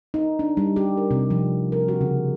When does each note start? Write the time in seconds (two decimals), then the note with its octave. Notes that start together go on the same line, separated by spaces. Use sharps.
0.14 D#4
0.39 D4
0.57 G3
0.76 G4
0.97 A#4
1.11 C3
1.30 F3
1.72 A#4
1.88 F#4
2.01 C#3